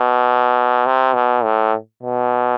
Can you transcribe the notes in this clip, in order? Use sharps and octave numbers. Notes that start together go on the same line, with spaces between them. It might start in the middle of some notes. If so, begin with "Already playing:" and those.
Already playing: B2
C3
B2
A2
B2